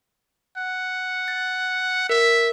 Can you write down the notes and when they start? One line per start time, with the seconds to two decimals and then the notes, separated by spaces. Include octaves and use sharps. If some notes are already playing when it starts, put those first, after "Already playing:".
0.57 F#5
1.28 A6
2.09 A#4 E5